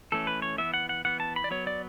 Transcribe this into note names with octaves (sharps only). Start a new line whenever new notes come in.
E3 A3 C#4 A4
B4
C#5
E3 B3 E5
F#5
F#5
E3 B3 F#5
A5
B5
D5
F#3 B3 C#5
D5